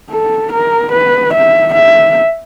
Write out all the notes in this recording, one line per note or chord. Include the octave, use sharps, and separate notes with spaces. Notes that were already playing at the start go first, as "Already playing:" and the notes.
A4
A#4
B4
E5
E5